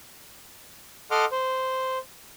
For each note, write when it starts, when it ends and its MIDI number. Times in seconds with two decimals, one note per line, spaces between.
1.11 1.25 69
1.11 1.25 75
1.11 1.25 78
1.11 1.25 84
1.11 1.25 86
1.11 1.25 89
1.32 1.98 72